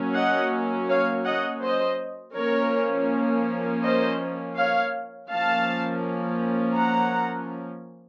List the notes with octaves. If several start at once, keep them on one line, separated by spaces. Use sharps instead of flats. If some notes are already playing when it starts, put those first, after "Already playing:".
Already playing: F#3 A#3 C#4
D#5 F#5
C#5 F5
D#5 F#5
C5 D#5
F3 A#3 C#4 A#4 C#5
C5 D#5
C#5 F5
F3 A#3 C#4 F5 A5
F#5 A#5